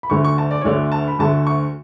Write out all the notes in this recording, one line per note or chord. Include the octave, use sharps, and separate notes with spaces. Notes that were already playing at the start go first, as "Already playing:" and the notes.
B5
D2 D3 A3 C#6
C#6
A5
D5
C#5
D2 D3 A3 D5
A5
B5
D2 D3 A3 A5
C#6